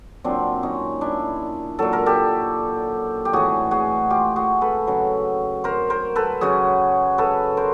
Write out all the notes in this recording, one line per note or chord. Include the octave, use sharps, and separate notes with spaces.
A#2 F#3 C4 D4
C#4 D#4
D4 E4
A#2 F#3 A4
A#4
G4 A4
G4
A2 E3 F#4 G#4
F#4 G#4
F4 G4
F#4 G#4
A4 B4
C#3 F#3
A#4 C5
A#4 C5
A4 B4
C#3 F#3 F#4 G#4
A4 B4
A#4 C5